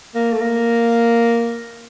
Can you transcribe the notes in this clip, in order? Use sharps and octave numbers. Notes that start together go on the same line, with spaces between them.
A#3
A3
A#3